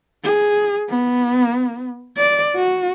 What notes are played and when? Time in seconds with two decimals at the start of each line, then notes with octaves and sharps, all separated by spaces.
0.24 G#4
0.89 B3
2.17 D5
2.55 F#4